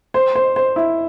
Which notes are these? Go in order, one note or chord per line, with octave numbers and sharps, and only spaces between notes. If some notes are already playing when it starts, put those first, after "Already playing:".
C5
C5
C5
E4